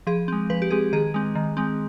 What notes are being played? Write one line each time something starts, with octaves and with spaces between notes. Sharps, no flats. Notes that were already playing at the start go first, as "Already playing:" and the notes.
F3 G#4
G#3 C4
F3 B4
G4
G#3 C4 G#4
D#3 G#4
G#3 C4
D#3
G#3 C4